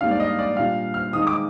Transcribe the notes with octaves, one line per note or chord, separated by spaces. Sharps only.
G#2 G3 A#3 D4 F5
D5
D#5
D5
A#2 G3 D4 F5
F6
D#3 G#3 D#4 D#6
D6